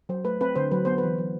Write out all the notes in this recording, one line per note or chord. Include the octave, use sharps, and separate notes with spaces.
F#3 C5
A3 B4
C4 B4
D3 C5
F#3 B4
B3 C5
B4
E3
F#3